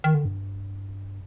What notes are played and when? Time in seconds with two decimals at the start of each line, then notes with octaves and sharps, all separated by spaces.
0.04 D#3
0.14 D3
0.25 G2